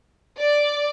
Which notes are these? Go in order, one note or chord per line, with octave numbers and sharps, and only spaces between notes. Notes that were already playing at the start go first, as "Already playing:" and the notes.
D5